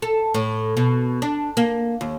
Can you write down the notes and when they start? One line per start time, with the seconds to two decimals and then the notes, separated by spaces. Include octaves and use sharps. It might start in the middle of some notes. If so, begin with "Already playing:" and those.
0.02 A4
0.34 A2
0.77 B2
1.22 D4
1.57 A#3
2.01 D#2